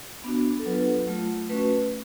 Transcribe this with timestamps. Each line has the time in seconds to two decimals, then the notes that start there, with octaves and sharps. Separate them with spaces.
0.24 B3 D4 F#4
0.59 A4
0.66 F#3 B3 D4 F4 B4
1.07 F#3 A3 F4
1.49 A3 C#4 F#4 B4